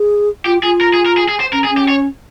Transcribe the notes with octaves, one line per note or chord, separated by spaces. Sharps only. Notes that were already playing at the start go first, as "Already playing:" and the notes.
Already playing: G#4
F4 G4
F4 G#4
A#4
G#4
A#4
G#4
G#4
C5
C#4 A#4
G#4
C#4
G4
C#5